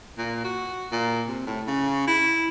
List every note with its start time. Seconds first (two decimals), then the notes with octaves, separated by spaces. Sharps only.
0.18 A#2
0.44 F#4
0.92 A#2
1.28 C3
1.46 A2
1.67 C#3
2.08 E4